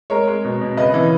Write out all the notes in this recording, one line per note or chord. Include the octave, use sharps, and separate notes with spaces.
G#3 A#4 C#5
G#3
B2
B2
C#3 B4 D#5
E3